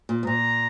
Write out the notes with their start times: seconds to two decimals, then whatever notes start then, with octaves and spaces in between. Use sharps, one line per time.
0.09 A#2
0.23 G#2
0.27 A#2 A#5